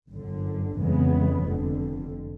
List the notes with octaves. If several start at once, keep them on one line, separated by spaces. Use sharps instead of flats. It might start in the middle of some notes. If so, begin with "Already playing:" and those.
G1 F#2 D3
F2 C#3 E3 G#3 B3
F1 F2 D3